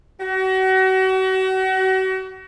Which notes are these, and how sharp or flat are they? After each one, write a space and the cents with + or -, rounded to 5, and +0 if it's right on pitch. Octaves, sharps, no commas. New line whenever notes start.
F#4 +35